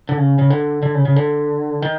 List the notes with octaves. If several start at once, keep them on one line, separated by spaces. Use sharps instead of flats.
D3
C#3
C#3
D3
D3
C#3
C#3
D3
D#3